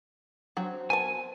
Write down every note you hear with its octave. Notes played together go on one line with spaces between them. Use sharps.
F#3 C4 D4 C5 F#5 G5
B3 A#4 G#5 A5